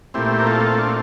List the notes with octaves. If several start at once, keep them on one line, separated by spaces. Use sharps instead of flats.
A#2 A3 C4 E4 G4
A#4
F4 A4
D4 F4